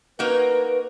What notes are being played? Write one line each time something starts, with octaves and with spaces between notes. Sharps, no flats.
A#3 D#4 F#4 B4